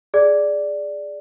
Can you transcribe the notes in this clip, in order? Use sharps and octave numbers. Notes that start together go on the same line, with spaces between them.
G#4 D5